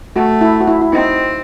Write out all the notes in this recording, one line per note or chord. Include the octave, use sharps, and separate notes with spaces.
A3 F#4
E4
F#4
E4
E4
C4 D#4